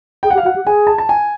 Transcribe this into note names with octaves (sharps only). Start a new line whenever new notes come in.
G#4 G5
F#5
G4
F5
F#4 F#5
G4
G#4 G#5
A5
A5
G#5